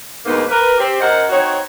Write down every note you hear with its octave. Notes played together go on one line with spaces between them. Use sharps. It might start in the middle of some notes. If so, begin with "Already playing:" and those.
D2 G#2 A#3 B3 D#4
A#4 B4
C4 G4
F#2 A#4 C5 D#5 F#5
C4 D#4 F#4 C#5